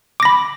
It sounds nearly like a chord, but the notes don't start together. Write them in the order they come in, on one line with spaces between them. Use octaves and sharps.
D6 A#6 B5